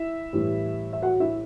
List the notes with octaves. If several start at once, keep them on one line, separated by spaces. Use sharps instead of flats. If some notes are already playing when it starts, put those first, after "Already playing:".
Already playing: E4 E5
A2 E3 G3
E5
F#4 F#5
E4 E5